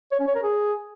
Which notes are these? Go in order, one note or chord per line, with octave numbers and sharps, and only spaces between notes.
C#5
C#4
C#5
A#4
G#4